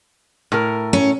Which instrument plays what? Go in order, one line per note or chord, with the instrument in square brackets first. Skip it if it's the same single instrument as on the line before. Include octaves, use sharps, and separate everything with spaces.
[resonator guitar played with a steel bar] A2 A#4
[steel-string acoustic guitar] C#4